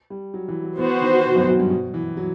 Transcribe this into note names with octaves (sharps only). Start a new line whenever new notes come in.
G3
F#3
E3
F#3
E3 B3 F#4 C5
D#3
B2
F#2
F#2
G2
B2
E3
F#3